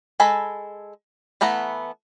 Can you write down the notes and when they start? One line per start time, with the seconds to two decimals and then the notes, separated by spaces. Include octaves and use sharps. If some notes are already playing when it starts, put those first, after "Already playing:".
0.20 G#3 A4 G#5 A5 B5
1.41 E3 A3 B3 F#5 A#5